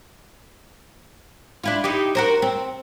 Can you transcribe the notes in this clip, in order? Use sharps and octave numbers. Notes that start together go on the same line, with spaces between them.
D4 E4 F4
D#4 E4 G4
F#4 A#4 C5
C4